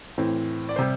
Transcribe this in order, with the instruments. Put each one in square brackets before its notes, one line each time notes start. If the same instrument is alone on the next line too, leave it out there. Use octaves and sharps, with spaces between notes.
[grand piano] A2 E3 C4
D5
C3 G3 C5